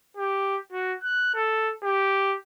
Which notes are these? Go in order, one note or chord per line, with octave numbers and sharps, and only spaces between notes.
G4
F#4
F#6
A4
G4